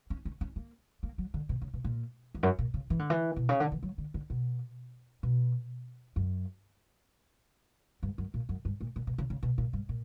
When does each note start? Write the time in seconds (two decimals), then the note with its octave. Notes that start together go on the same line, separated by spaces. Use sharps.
0.10 C#4
0.25 C#4
0.41 C#4
0.56 A#3
1.03 A#3
1.18 F#3
1.34 D3
1.49 B2
1.62 C#3
1.74 B2
1.84 A#2
2.35 E2
2.43 F#2
2.59 A#2
2.74 C#3
2.90 E3
2.99 D3
3.10 E3
3.36 B2
3.49 C#3
3.60 D3
3.72 E3
3.83 F#3
3.98 D3
4.14 D3
4.30 B2
5.23 B2
6.16 F#2
8.03 G2
8.18 F#2
8.34 A#2
8.49 F#2
8.65 G2
8.81 A#2
8.96 A#2
9.07 B2
9.18 C#3
9.30 C#3
9.43 B2
9.58 A#2
9.73 G2
9.89 A#2